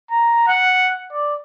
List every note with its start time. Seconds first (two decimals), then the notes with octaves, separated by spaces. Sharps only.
0.11 A#5
0.48 F#5
1.12 D5